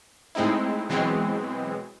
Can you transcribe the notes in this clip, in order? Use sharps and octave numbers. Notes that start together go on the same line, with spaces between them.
A2 G#3 C4 D#4 E4
B2 E3 F#3 G#3 B3 C4